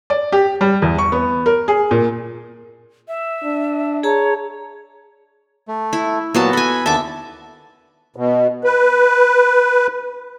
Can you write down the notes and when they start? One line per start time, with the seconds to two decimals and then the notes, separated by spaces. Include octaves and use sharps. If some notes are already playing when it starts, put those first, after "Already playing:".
0.10 D5
0.32 G4
0.61 G3
0.82 E2
0.98 C#6
1.12 B3
1.46 A#4
1.68 G#4
1.91 A#2
3.08 E5
3.44 D4
4.03 G#4 C#5 A5 A#5
5.68 A3
5.93 E4
6.34 A#2 F#3 B3 F#4 A5
6.53 A4 G#5 B5
6.86 D#2 D3 E5 A5 D6
8.16 B2
8.64 B4